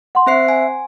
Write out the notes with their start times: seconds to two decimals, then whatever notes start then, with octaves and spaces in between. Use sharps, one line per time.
0.15 F#5 C6
0.27 C4 C5 E5 C7
0.49 G#5